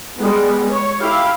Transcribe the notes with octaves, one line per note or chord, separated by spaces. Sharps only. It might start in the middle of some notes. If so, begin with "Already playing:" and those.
G3 G#3 B3
C#5
E4 G4 F5